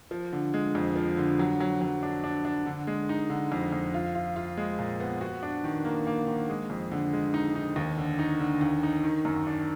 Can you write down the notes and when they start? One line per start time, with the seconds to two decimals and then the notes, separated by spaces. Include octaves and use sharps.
0.11 F3
0.33 D3
0.54 G#3
0.75 F2
0.96 F3
1.17 D3
1.39 F#3
1.60 F#3
1.81 F#3
2.03 D4
2.24 D4
2.45 D4
2.66 D3
2.87 G#3
3.09 D#4
3.30 D3
3.52 F2
3.73 F2
3.94 F4
4.15 F4
4.36 F4
4.57 G#3
4.79 A#2
5.00 B3
5.21 F#4
5.43 D4
5.64 D#3
5.85 A#3
6.07 A#3
6.27 D#3
6.49 G#3
6.70 F2
6.92 D3
7.13 G#3
7.34 D#4
7.55 D#4
7.76 D#2
7.98 D3
8.19 D#4
8.40 D3
8.61 D#2
8.83 D#4
9.04 D#3
9.25 F#2
9.47 D4